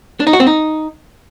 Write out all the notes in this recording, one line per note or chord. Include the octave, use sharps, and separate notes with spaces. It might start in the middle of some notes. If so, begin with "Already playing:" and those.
D4
D#4
F#4
C4
D#4